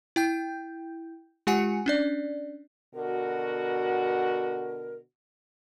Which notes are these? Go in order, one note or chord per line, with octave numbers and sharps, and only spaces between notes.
E4 G5 G6
G#3 F4 G4 F#5 G#5 C#7
C#4 D4 D5
B2 D3 F#4 A#4